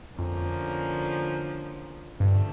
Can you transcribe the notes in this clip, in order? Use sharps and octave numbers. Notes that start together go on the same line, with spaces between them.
F2 D3 F3 A#3 C#4
G2 D3 F3 A3